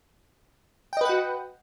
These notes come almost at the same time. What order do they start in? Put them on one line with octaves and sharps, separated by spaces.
G5 D#5 B4 F#5 F#4